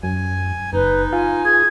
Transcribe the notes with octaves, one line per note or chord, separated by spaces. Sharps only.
F#2 G#5
F#1 D#4 B4
F4 G#5
G#4 G#6